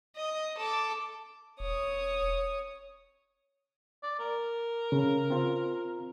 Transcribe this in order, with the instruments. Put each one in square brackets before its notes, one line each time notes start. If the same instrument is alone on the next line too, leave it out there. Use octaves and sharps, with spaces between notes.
[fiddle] D#5
A4 D6
[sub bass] E1 [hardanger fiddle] C#5 D#6
[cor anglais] D5
A#4
[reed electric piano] C#3
C4 F4